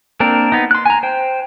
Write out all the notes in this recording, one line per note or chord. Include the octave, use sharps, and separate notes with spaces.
A#3 C4 D4 A#4
B3 D#4
C6 F#6
G#5 A#5
C5 G5